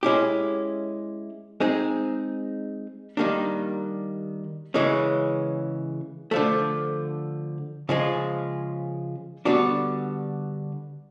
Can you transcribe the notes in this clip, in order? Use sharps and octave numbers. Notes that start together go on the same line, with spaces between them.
G#3 C#4 E4 G4
G#3 C4 D#4 G#4
D#3 G3 A#3 D4
C#3 E3 G#3 C#4
D3 F3 A3
C#3 F3 G#3
D3 G3 B3 D4 F#4